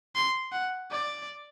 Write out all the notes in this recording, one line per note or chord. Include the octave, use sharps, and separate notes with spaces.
C6
F#5
D5